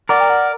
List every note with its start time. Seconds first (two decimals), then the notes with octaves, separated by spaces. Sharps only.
0.09 A#4 D5 F#5
0.20 G5
0.30 F#5